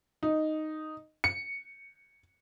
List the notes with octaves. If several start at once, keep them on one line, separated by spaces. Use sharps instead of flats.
D#4
C#7